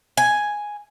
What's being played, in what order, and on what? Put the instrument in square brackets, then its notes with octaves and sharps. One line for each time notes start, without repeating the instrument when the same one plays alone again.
[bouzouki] G#5